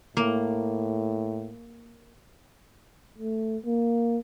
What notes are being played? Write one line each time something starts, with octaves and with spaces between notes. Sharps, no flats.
A2 A#3
A3
A#3